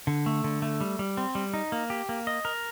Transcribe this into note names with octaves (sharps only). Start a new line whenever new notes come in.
D3
A3
D3
A3
G3
G3
C4
G3
D#4
A#3
G4
A#3
D#5
A#4